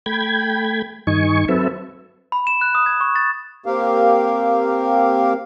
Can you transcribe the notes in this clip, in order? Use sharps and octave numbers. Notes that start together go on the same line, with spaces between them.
A3 G5 B5 G#6
G2 D#3 D#4 G#5 C#6
F#3 C4 A4 B4 E5
B5
E7
F#6
D#6
G#6
C#6
A6
A#3 C4 G4 A#4 F5